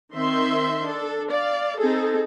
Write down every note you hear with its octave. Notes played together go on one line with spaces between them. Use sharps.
D#3 C4 E5 C6
D4 A4
D5 F5
C4 D#4 G#4 A4